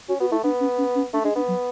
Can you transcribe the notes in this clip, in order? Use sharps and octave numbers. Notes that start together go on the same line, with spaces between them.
C#4 F#4
B3 F#4
A3 E4
B3 D4
C#4
C#4
C#4
A3 D4
G#3 D4
B3 D4
F#3